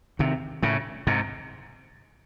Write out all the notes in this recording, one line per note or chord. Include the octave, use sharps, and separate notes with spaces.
C3 D#3
A2 C#3
G#2 C3